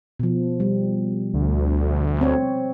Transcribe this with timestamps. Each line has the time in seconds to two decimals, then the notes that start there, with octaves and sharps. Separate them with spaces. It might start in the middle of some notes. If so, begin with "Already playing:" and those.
0.20 B2 F3
0.60 G3
1.34 D2
2.21 C4 C#5